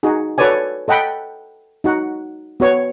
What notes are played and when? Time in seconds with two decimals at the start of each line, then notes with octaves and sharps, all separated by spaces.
0.03 D#4 F#4 G#4
0.38 F#4 A4 B4 C#5 D5 G#5
0.88 A4 D#5 F#5 G5 B5
1.84 D#4 F#4 F#5
2.60 B3 F#4 C#5